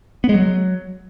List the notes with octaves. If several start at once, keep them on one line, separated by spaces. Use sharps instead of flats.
B3
G#3
F#3